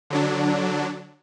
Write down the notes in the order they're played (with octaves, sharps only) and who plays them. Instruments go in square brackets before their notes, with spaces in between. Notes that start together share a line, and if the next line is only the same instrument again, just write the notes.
[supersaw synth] D3 F#3 D4